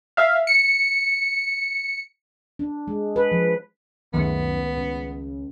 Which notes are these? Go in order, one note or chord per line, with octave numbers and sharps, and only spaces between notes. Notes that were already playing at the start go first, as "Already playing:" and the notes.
E5 F5
C#7
D4
G#3
B4
F3
C#2 F#2 D#3 A3 B3
C#3